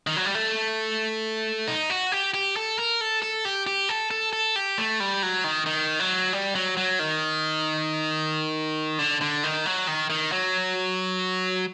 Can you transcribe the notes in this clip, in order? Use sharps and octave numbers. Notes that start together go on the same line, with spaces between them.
D#3
F#3
G3
A3
D#4
F#4
G4
G4
A4
A#4
A4
A4
G4
G4
A4
A4
A4
G4
A3
G3
F#3
D#3
D#3
F#3
G3
F#3
F#3
D#3
D3
D3
D#3
F#3
D#3
D#3
F#3